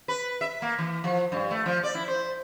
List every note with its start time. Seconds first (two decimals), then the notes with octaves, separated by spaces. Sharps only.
0.08 B4
0.41 E5
0.62 A#3
0.78 E3
1.04 F3
1.32 G2
1.51 A3
1.66 F3
1.83 D5
1.95 E4
2.08 C5